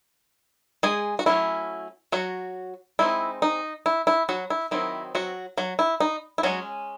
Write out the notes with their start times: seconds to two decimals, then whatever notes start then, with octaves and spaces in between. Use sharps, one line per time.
0.83 G#3 G#4
1.19 F#4
1.26 F#3 A3 C#4 E4
2.12 F#3 F#4
2.99 G#3 C4 D#4 E4
3.42 D#4
3.86 E4
4.07 E4
4.29 F#3 F#4
4.50 E4
4.71 D#3 F#3 C4 D#4 E4
5.15 F#3 F#4
5.57 F#3 F#4
5.79 E4
6.00 D#4
6.38 E4
6.43 F#3 G#3 C#4 F#4